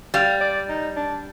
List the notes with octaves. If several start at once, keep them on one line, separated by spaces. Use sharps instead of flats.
G3 F5
D5
D#4
D4